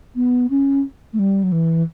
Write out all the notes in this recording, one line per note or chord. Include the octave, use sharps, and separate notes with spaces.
B3
C#4
A3
G3
F#3
E3